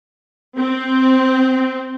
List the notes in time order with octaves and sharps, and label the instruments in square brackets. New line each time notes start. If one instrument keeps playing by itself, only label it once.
[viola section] C4